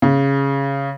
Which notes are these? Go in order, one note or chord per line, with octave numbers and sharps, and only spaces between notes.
C#3